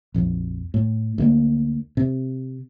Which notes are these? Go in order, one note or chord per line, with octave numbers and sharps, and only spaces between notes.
A#1 F2
A2
D2 A3 A#3
C3